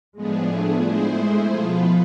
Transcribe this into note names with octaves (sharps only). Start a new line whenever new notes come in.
A2 F3 G#3 B3 D4 G#4
A3
G#3 A3 E4 G#4 C5
G#3
B2 F3 B3 F4 B4